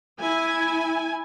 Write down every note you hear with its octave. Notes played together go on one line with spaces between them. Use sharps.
E4 G#5